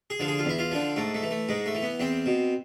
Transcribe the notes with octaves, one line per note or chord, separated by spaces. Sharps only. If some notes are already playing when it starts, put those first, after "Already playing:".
G#4
D3 F3
G#4
F4
E2 E4
F4
D3 F3
G#2 A3
A3
E3
A3
G#2 G#3
A3
E3
B3
E2 C4
B2